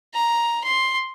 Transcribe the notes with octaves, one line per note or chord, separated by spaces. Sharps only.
A#5
C6